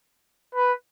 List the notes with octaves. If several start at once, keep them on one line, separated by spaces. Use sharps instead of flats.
B4